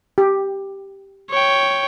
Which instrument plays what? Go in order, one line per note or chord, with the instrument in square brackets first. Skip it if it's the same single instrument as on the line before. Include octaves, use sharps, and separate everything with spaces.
[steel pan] G4
[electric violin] C#5 G5